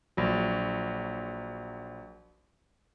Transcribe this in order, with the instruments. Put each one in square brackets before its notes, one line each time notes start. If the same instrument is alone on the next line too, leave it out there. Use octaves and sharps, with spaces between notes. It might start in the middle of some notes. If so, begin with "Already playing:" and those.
[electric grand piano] A#1 F#3